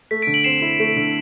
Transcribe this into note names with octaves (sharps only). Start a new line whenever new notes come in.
A3 B6
D3 B6 D7
D7 F#7
C4 C7 E7
E4
A3
D3